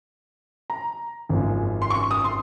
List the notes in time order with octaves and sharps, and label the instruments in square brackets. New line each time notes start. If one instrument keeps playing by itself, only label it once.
[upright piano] A#5
G#1 F#2 F3 G#3
C6
C#6
D#6
C6